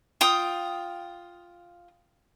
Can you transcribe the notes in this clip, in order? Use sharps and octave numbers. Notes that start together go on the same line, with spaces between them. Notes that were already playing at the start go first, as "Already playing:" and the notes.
F4 G5 D#6